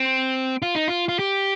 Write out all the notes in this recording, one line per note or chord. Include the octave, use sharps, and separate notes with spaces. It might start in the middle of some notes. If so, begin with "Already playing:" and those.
Already playing: C4
F4
D#4
F4
F4
G4